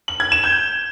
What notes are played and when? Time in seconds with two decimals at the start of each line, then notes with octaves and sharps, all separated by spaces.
0.08 F#7
0.20 G#6
0.32 E7
0.44 G6